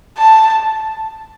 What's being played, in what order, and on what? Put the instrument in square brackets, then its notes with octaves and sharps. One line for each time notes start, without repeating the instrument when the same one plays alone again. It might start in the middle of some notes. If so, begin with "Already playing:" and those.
[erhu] A5